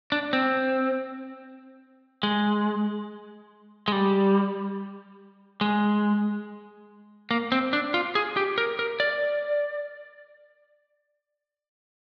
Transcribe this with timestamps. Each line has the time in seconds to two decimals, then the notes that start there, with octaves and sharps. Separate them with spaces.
0.12 D4
0.33 C4
2.23 G#3
3.88 G#3
3.92 G3
5.61 G#3
7.31 A#3
7.52 C4
7.73 D4
7.94 F4
8.15 G#4
8.37 G4
8.58 A#4
8.79 A#4
9.00 D5